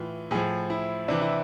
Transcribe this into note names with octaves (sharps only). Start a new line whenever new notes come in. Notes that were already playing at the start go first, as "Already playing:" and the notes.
Already playing: A2 E3 F4
A2 F3 G#4
E4
C3 E3 D4
E4